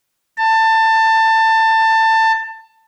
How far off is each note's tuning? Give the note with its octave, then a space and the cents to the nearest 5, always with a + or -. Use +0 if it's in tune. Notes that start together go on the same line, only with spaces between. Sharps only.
A5 +20